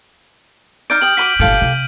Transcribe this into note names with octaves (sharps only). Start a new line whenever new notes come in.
D#4 D5 F6 G6 D7
G4 G5 D#6 F#7
F#4 B5 D6 B6 D#7 G7
G1 A#2 G4 A4 F5
C3